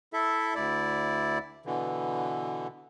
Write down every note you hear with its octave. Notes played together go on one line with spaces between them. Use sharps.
E4 A4 E5
D2 E4 D5
B2 D3 E3